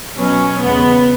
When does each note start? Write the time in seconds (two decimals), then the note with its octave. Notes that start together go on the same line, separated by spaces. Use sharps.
0.17 B2 F#3 B3 C#4
0.62 E2 C#3 G#3 B3